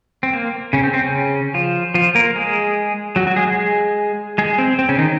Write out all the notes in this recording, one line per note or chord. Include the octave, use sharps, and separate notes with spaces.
C4
A#3
C#3 C#4
C4
C4
C#3 C#4
F3 F4
F3 F4
A#3 A#4
G#3 G#4
F#3 F#4
F#3 F#4
G#3 G#4
G#3 G#4
G#3 G#4
C4
C4
C#3 C#4
D#3 D#4